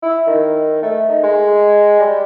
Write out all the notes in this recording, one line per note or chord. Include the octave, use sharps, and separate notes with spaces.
E4
D#3
A3
D#4
G#3
G3